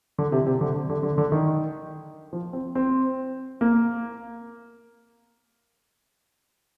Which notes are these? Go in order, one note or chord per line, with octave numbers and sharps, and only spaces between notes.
D3
C3
C3
D3
D3
D3
D3
D#3
F3
C4
C4
A#3